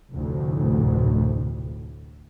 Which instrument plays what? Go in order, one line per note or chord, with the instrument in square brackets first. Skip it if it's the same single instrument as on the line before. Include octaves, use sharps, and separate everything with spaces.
[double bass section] F1 D2 A2